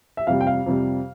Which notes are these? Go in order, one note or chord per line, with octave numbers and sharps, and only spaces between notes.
E5
F2 C3 G3 F5
G5
F5
F2 C3 G3